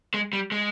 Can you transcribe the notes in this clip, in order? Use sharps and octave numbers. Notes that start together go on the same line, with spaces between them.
G#3
G3
G#3